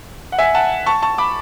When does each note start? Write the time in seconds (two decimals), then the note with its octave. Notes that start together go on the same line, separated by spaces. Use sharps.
0.32 F#5
0.38 E5 G#5
0.55 F#5 A5
0.86 A5 C#6
1.02 A5 C#6
1.18 B5 D6